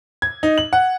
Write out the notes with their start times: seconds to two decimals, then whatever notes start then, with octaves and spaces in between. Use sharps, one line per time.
0.22 G#6
0.43 D#4
0.58 F#7
0.73 F#5